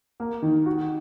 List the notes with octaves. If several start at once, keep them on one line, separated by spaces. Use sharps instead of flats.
A#3
D#3
F#4